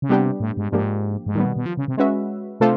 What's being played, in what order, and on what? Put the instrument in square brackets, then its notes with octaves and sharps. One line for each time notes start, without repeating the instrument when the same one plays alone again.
[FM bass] C#3
[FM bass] C3 [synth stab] G3 B3 D4 G4
[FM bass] A2
G#2
[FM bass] G#2 [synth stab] F3 A#3 D4 G4
[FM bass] G#2
[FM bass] A2 [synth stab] D#3 G3 B3
[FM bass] B2
B2
F3
C#3
C3
[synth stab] G#3 C#4 F#4 B4 E5
[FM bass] C3 [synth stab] A3 D4 F4 A4 C5